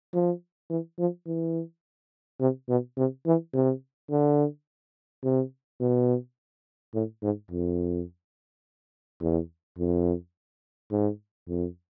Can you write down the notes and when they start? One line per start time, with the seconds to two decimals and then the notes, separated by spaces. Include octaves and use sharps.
0.14 F3
0.70 E3
0.99 F3
1.27 E3
2.40 C3
2.69 B2
2.97 C3
3.26 E3
3.54 C3
4.10 D3
5.24 C3
5.80 B2
6.94 A2
7.22 G#2
7.51 F2
9.21 E2
9.78 F2
10.91 G#2
11.48 F2